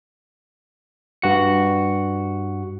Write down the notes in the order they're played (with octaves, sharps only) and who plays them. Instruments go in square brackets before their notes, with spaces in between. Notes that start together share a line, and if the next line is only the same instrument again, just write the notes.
[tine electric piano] G2 F#4 C#7